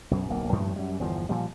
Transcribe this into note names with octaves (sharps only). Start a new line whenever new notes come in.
B1 F#2
D1 B1 A#3
F#2 A2 C#3 F3
F#2 G3
G1 E2 F3
A#2 F3 G3